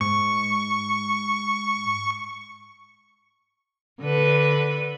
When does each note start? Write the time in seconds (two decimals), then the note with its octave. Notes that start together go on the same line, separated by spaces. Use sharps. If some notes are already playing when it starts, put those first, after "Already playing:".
0.01 G#2 C#6
4.01 D3 B4